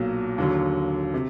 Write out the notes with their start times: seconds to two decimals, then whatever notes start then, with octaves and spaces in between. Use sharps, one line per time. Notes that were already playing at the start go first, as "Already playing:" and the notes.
Already playing: B1 A#2 F#3
0.38 D#2 D3 F#3
1.14 C3